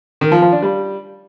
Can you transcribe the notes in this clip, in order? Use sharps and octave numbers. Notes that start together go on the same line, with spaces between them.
D#3
F3
F3
D4
G3